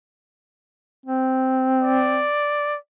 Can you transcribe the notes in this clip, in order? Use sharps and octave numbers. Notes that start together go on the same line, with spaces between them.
C4
D5